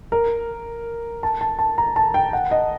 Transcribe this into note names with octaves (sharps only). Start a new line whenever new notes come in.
A#4
A5
A5
A5
A#5
A5
G5
F#5
D#5